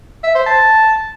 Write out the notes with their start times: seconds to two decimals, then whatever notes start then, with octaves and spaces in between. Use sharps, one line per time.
0.23 E5
0.35 C5
0.46 A5